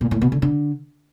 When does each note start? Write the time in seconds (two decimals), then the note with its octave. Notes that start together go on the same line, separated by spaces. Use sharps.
0.01 A#2
0.11 A2
0.22 B2
0.32 D3
0.42 D3